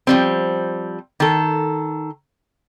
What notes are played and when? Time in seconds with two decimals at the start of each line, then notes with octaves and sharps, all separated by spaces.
0.07 F3 G3 C4
1.20 D#3 A4